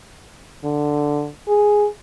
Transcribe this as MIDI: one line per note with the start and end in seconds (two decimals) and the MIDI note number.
0.64 1.29 50
1.48 1.87 68